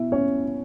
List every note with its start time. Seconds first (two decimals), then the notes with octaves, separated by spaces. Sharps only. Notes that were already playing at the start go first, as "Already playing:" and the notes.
Already playing: B2 E4
0.12 C#4 C#5